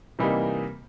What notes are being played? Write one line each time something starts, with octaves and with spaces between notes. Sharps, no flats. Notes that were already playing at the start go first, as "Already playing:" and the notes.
C3 E3 G3 A#3 D#4